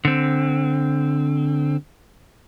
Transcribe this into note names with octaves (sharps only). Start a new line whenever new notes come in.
D3 C4